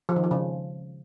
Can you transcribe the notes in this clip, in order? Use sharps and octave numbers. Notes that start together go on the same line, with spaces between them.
F3
D#3
F3
C#3